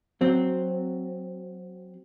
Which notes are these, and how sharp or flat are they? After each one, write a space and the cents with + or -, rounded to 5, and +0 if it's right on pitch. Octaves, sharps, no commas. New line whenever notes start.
F#3 +0 C4 +0